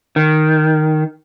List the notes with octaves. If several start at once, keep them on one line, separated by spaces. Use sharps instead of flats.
D#3